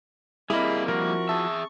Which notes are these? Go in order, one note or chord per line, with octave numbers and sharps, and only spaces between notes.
G3 A#3 C4 E4 G#4 A#4 D#5 B5
F3 E4 F#4 A#4 C#6
G#4 E5 A5